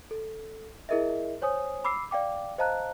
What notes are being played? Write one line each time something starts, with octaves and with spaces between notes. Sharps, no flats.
A4
E4 G#4 A#4 D#5 E5
C5 C#5 G#5 D#6
B5 D6 E6 C7
D5 F5 G5 D6
C5 D#5 F5 A5 A#5 F#6